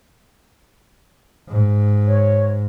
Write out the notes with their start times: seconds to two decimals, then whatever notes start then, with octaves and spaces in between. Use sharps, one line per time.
1.48 G#2
2.07 C#5